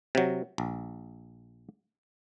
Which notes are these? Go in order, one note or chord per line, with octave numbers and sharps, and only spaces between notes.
C3 F#3
A#1